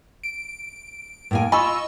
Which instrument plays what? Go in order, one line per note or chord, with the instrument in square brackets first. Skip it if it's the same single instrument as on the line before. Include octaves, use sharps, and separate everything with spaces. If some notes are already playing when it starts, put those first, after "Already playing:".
[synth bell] D7
[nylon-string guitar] A2 A#3 G#5
[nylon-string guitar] F4 [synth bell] D#5 C#6 E6 [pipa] G#5 B5